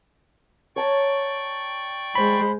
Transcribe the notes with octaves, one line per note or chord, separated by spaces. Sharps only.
C#5 D5 G5 A5 A#5 C#6
G#3 C5 B5